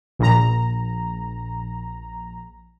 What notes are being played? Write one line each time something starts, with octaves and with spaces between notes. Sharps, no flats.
A#1 A#5